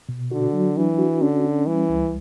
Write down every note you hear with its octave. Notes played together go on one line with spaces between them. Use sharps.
B2
D3 F#4
F#3
E3 D4
F#4
D3 C#4
C#4
E3 G3
C#2